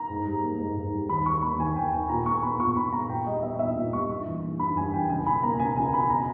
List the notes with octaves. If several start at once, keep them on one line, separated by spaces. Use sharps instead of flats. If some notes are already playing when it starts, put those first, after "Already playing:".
Already playing: A#5
G#2
G3
A#3
G#2
G#2
G3
D#2 B5
D#3 C#6
A#3 B5
D#2 G#5
D#2 G5
D#3 G#5
A#2 A#5
G#3 C#6
B3 B5
A#2 C#6
A#2 B5
G#3 A#5
A#2 G5
G3 D#5
B3 E5
A#2 E5
A#2
G3 C#6
G2
E3
A#3
G2 B5
G2 G#5
E3 G5
C#2 G#5
B2 B5
A#3 A#5
C#2 G#5
C#2 G#5
B2 B5
A#5